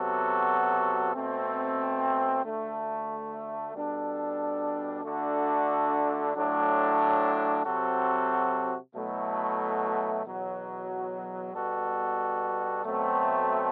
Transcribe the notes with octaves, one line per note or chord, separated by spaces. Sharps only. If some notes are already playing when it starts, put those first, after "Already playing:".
Already playing: C3 F#3 B3 F#4 A4
B2 A3 C4
D2 D3 A3
B2 G3 D4 A4
D3 A3 D4 F#4 A4
A2 F#3 A3 D4
C3 F#3 C4 F#4 A4
B2 F#3 A3 E4
E2 B2 F#3
B2 G3 B3 F#4 A4
B2 F#3 A3 C4